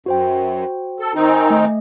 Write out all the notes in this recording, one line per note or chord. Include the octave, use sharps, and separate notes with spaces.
F#2 F#4 C5 G5
A4
D#3 C4 D#4
G#5
A3 D#5